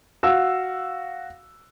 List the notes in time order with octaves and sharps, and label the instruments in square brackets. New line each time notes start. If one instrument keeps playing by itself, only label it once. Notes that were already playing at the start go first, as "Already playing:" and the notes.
[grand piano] F#4 F5 E6